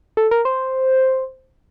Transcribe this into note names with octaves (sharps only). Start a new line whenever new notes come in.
A4
A#4
C5